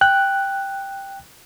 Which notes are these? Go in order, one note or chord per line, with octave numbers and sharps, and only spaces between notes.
G5 F#6